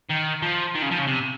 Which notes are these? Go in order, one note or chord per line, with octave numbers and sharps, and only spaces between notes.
D#3
F3
D#3
C#3
F3
C#3
C3